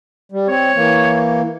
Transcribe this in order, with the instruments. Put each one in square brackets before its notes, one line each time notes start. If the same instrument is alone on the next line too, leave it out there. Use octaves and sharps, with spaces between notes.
[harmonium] G3
[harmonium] C4 [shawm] C#5
[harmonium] E3 A#3